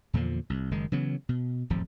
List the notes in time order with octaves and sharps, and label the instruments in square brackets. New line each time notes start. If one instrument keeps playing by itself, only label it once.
[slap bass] E2 A#2 D3 F3
C2
F#1 D#3 G#3
C#3 E3 F#3 B3
B2
D1 G#1 F2 F3